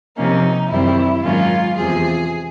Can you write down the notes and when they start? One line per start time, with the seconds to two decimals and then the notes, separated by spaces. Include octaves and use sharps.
0.17 C3 F3 A#3 C#4 D#4
0.71 F#2 D#3 G3 C4 E4
1.24 G#2 D#3 F#3 A#3 C#4 F4
1.77 E2 C3 F3 G#4